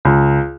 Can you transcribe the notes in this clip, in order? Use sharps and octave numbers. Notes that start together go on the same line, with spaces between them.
C#2